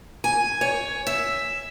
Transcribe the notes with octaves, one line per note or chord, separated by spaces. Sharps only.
G#5
C#5
E5